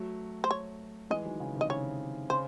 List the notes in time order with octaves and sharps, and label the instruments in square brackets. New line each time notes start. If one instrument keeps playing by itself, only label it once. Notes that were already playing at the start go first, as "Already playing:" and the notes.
Already playing: [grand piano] F#3 A3
[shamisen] C5
C#5
[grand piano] E3 G#3 [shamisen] D#5
[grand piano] D#3 F#3
C#3 E3
C3 D#3
[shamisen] D#5
[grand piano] C#3 [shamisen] C#5
[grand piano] C#3 [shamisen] C5